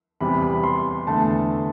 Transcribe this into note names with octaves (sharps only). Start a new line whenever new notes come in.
E2 C3 G3 B5
B5
C6
E2 D3 A3 A5